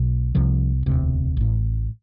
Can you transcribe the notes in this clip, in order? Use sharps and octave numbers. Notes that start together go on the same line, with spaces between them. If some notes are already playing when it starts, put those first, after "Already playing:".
Already playing: B1 B2
C2 C3 F3
E1 D2 C3
A1 A2